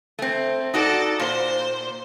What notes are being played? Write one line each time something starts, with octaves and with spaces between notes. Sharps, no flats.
A3 C4
D#4 F#4 A4 D5
A#2 C5